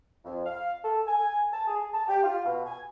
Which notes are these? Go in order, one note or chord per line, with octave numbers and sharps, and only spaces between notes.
F2
F5
A4
G#5
A5
G#4
A5
G4
F4
B2
G#5